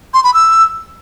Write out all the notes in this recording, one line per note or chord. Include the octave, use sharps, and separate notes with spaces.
C6
B5
E6